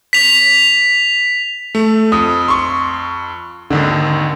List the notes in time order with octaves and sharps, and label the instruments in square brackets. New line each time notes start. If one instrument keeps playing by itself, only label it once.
[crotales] B6 F7
[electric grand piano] A3
[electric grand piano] F2 [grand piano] D#6
[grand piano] C6 C#6
[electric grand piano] G#1 D#2 D#3 [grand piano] D3